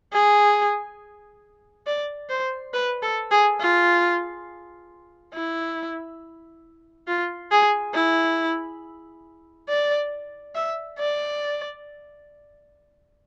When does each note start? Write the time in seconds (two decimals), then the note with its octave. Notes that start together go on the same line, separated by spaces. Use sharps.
0.13 G#4
1.87 D5
2.30 C5
2.74 B4
3.03 A4
3.32 G#4
3.60 F4
5.34 E4
7.08 F4
7.52 G#4
7.95 E4
9.68 D5
10.55 E5
10.99 D5